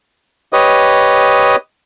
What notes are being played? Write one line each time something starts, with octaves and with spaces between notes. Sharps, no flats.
G4 B4 C#5 D#5 D#6